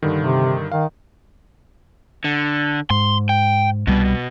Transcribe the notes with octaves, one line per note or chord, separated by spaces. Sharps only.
G2 D3 D#3
C3
D#3 F5
D3
G#2 C6
G5
C2 B2 G3